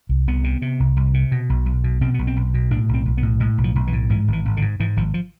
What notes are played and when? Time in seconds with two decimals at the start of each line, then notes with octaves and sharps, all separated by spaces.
0.09 C2
0.27 C2 B3
0.44 C3
0.62 C3
0.80 C2
0.97 C2
1.14 C3
1.31 B2
1.50 B1
1.66 B1
1.84 B2
2.01 B2 C4
2.14 B1 B3
2.27 C4
2.36 B1
2.54 B2
2.71 A2 D4
2.89 B1 C4
3.06 B1
3.17 B3
3.23 A2
3.40 A2 G#3
3.58 B1
3.64 F3
3.75 B1
3.87 E3
3.93 A2
4.10 G#2 E3
4.28 G#1
4.33 E3
4.45 G#1
4.57 D3
4.62 G#2
4.80 G#2 E3
4.97 G#1 F3
5.14 F3